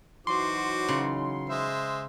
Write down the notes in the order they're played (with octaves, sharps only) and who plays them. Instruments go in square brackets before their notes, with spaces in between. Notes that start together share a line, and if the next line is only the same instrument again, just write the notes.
[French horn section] E3 F#3 D#4 [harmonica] F#4 C5 D6 [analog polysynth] C6
[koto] C#3
[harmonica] G#3 C5 E5